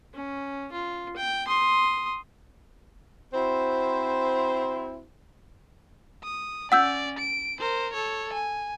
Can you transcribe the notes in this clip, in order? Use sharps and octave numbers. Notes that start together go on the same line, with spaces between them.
C#4
F4
G5
C6 D#6
C4 E4 F#4 C5
D#6
C#4 D5 F#5 E6 G6
D7
A#4 C5
A4 C#5
G#5